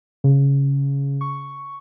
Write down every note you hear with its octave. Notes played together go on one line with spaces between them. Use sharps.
C#3
C#6